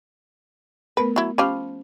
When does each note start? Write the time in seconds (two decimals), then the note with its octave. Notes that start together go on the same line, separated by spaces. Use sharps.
0.97 A3 B3 A#4 B4
1.16 F#3 E4
1.38 F3 C#4 G4 F5 B5 F6